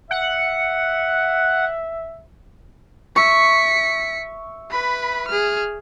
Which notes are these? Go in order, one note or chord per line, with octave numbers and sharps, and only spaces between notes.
E5 F#5
E5 C#6 B6 C#7
B4 B5
G#4 F6